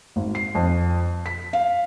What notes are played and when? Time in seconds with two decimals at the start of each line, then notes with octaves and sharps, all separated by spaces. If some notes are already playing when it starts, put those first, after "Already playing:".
0.16 G#1
0.35 C7
0.55 F2
1.26 B6
1.53 F5